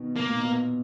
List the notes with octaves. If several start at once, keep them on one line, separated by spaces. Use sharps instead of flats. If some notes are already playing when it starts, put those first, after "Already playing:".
Already playing: B2 D#3
A#3
A#2
B2